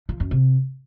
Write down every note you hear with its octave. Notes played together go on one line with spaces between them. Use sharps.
F3
F#2
C3